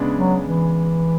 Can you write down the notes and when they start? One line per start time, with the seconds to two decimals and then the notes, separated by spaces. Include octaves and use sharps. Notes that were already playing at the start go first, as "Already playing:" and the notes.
Already playing: C#3 G#3 B3 D4
0.16 F#3
0.44 E3